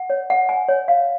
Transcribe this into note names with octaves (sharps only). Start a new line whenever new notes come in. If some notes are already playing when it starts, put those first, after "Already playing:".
Already playing: F#5
C#5
F#5
G#5
C#5
F5